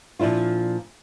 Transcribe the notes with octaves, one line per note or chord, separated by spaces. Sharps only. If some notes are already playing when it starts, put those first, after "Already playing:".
A#2 F3 D4 E4 F4